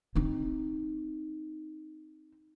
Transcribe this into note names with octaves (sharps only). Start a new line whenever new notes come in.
C4 D#4